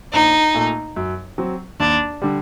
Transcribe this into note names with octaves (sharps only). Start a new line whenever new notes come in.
A#1 D#4
A#2 A3
F#2
F#3 C4
D#2 D4
D3 G3